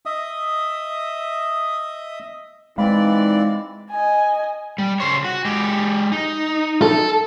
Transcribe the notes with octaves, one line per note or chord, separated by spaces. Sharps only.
D#5 E5 D#6
E3 G#3 C4 D#4 D5 F5 B5
D#5 G#5
G3
C#3 C5 C#5
F#4
G#3 G4
D#4
A4